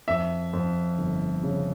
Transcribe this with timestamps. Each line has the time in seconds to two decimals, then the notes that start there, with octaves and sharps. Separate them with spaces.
0.08 F2 E5
0.53 F2
0.98 G1
1.43 C#3